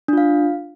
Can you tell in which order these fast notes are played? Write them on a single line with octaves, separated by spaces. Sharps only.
D4 F4 F5